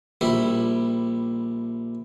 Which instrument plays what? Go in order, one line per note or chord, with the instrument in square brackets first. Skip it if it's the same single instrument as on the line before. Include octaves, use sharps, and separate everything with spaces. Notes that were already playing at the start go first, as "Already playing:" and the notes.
[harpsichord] A#1 G3 E4